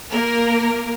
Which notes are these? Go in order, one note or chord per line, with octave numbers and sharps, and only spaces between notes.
A#3 A#4